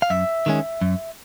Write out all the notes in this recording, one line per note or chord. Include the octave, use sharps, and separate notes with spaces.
F5
F#2 E5
D#3 G#3 C#4
F#2